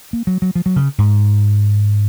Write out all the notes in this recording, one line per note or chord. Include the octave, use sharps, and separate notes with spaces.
A#3
F#3
F#3
F3
F#3
C#3
G#2